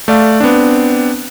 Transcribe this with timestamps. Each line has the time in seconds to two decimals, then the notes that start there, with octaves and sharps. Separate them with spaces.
0.08 A3 D5 F5
0.40 B3 C4 D4